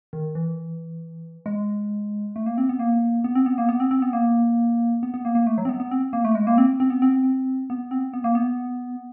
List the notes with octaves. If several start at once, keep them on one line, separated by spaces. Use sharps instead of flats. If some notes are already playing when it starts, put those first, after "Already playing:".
D#3
E3
G#3
A3
A#3
C4
B3
A#3
B3
C4
B3
A#3
B3
C4
C4
B3
A#3
B3
B3
A#3
A#3
A3
F#3
C4
B3
B3
C4
A#3
A3
G#3
A#3
C4
C4
B3
C4
B3
C4
B3
A#3
B3